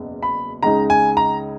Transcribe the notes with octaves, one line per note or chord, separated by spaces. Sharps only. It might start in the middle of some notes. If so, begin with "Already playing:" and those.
Already playing: F#1 E2 B2
B5
C#2 C#3 G#3 D#4 A#5
G#5
A#5